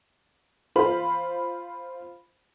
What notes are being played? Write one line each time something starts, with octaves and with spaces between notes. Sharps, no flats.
F4 C5 B5